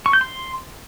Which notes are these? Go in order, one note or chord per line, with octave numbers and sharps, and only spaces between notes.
C#6
G6
C6